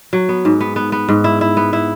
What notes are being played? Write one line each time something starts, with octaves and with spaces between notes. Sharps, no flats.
F#3
B3
G#2
B3
B3
B3
G#2
E4
E4
B3
E4